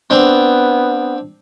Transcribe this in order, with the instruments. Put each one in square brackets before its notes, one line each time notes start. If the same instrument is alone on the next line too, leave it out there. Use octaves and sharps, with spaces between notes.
[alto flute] B3 [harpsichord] C4 D4